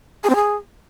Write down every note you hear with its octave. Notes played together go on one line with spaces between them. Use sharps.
G#4
C4
G#4